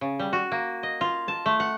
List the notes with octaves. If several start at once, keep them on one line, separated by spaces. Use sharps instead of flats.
C#3
G3
F#4
A#3
D#5
F4
A5
A3
F#5